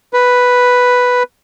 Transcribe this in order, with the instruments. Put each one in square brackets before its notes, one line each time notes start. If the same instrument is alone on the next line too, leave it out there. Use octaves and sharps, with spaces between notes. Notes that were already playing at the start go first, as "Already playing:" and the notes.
[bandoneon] B4